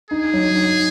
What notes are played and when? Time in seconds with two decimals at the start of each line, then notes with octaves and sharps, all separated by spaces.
0.11 D#4 G#4
0.33 F#3
0.55 D#4